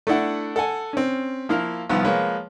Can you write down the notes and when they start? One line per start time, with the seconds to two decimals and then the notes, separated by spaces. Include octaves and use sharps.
0.07 A3 D4 E4 F#5
0.56 A4 F#5 G#5
0.93 C4 C#4
1.49 F3 A#3 E4 F5
1.90 C2 D#3 F3 B3
2.05 F3 G#3 A#3 B4 C#5